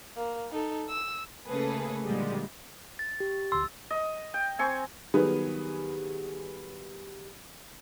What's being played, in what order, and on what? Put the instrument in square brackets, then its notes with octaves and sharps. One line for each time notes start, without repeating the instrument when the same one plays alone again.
[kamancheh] A#3
D#4 A4
E6
[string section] C#3 A3 A#3 G#4 A4 B4
A#2 D3 F3 G3 G#3
[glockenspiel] A6
[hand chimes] G4
[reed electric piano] D2 C6 [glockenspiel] E6
[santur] D#5
G5
C4 G#5 C#6
[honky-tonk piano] D#3 F#3 G3 B3 G#4 B4